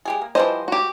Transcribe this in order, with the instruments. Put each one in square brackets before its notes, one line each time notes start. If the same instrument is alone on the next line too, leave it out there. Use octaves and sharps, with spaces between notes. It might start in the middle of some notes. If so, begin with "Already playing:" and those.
[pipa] G#3 G4 G#4
A#3
[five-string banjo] E3 D#5 [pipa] F3 G3 C5
[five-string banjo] F#4 G4